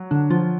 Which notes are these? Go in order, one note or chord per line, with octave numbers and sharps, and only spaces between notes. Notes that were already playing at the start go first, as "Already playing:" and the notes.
Already playing: F#3
D3 D4
F3 F4